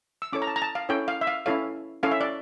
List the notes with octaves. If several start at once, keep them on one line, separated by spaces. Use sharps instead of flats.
E6
C#4 E4 A4 C#5 D6
A#5
A5
A#5
A5
F5
C#4 E4 A4 C#5 G5
F5
E5
F5
C#4 E4 A4 C#5 F5
C#4 E4 A4 C#5 F5
E5
D5